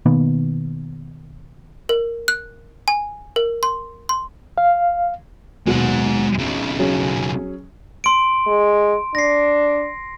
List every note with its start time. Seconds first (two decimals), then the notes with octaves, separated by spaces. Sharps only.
0.06 B2 D#3 A#3 B3
1.89 A#4
2.28 F#6
2.88 G#5
3.36 A#4
3.63 C6
4.09 C6
4.58 F5
5.67 D#2 B2 F#3 G#3 F#5
6.38 B1 C#3
6.79 F#3 C#4 G#4
8.04 C6 D7
8.47 G#3
9.15 D4 A#6 C7